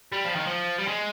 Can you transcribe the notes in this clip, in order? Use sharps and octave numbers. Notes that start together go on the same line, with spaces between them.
G3
F3
D#3
F3
G3
G#3